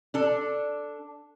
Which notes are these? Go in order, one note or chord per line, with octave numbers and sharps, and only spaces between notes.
D4 A4